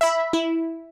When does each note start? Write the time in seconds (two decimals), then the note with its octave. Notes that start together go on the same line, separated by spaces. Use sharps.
0.01 E5 B5
0.33 E4